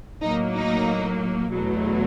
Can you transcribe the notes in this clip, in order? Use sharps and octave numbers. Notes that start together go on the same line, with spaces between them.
A2 F#3 A#3 D#4
D#4
E2 B2 F#3 A3